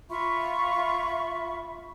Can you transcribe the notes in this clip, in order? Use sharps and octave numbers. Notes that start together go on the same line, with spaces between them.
F4 E5 B5 C#6